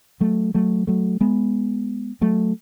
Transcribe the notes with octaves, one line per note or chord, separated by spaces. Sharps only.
F#3 A3
F#3 A3
F#3 A3
G#3 B3
F#3 A3